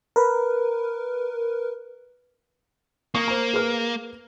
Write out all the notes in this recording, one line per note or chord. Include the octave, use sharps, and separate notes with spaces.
A#4 B4
A#3 C#6 D#6 C#7
C5 A#5
G#4 B4 F6